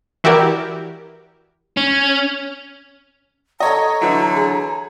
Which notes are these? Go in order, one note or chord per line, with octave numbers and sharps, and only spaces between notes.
E3 E4 F#4 G4 A#4 D5
C#4
A4 C#5 D#5 A#5
D3 E3 F#3 E4
G#4